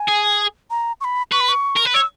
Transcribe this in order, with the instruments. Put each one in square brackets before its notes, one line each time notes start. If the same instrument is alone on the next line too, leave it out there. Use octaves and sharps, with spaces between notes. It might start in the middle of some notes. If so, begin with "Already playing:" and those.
Already playing: [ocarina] G#5
[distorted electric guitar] G#4
[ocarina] A#5
C#6
B5
[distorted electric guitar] B4 [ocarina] C#6
[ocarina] B5
C#6
[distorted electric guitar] A#4
B4
[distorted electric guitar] C#5 [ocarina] E6